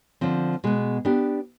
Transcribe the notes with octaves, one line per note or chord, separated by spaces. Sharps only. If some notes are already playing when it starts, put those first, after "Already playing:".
D3 F3 C4
B2 G#3 B3
B3 D4 G4